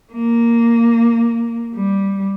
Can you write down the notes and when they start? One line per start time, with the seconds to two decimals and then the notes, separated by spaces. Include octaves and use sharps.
0.13 A#3
1.75 G3